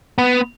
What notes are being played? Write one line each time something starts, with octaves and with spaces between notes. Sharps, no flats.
B3